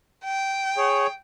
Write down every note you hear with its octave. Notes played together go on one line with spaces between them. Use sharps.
G5
G#4 C#5